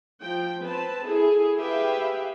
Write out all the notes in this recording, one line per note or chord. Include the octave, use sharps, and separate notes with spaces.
F3 G5
C4 B4 A5
E4 G#4 A4
G4 G#4 B4 E5 F5 G5